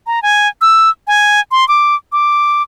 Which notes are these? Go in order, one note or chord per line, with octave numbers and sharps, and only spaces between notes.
A#5
G#5
E6
G#5
C6
D6
D6